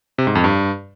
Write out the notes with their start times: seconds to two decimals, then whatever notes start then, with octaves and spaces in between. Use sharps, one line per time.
0.18 C3
0.27 G#2
0.35 F2
0.44 G2